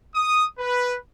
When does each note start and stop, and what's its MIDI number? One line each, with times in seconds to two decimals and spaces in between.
0.15 0.45 87
0.59 0.97 71